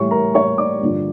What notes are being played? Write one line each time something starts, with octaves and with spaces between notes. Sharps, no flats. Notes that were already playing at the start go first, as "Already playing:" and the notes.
Already playing: A2 E3 G3 C#5 C#6
A#4 A#5
C#5 C#6
D5 D6
G2 D3 F3